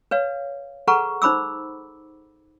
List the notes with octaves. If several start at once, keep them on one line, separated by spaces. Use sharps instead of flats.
B4 C#5 F5
G#4 A4 B4 F#5 A#5 C#6
D#4 C5 B5 D6 E6